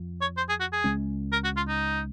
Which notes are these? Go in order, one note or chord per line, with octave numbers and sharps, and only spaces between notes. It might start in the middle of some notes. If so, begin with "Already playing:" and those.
Already playing: F2 F3
C#5
C5
G#4
F#4
G#4
C#2 C#3 G#3 C#4
A#4
F#4
F4
D#4